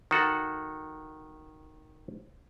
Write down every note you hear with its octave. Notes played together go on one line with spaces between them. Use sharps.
D#3 F#4 A4 F#5